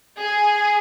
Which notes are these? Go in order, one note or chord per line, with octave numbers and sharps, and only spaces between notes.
G#4